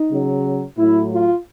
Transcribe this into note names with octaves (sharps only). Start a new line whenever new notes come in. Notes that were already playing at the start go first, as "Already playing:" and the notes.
Already playing: D#4
C#3 F#3
A2 F#3 E4
F4